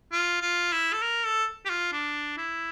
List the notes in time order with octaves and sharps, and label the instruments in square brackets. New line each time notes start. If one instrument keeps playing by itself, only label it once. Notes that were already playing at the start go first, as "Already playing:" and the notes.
[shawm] F4
F4
E4
A4
A#4
A4
G4
F4
D4
E4